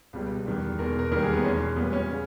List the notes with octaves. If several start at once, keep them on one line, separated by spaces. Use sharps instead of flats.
C#2 B2 G3
E2 D#3 G3
E2 B2 G#3 A#4
A#4
D#2 D#3 G3 A#4
G#4
B3
E2 B2 G#3 C#4
A#2 G3 B3
C#4
C#3